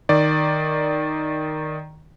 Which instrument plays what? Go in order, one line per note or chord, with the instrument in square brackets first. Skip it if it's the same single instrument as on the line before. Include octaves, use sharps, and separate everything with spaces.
[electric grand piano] D#3 D5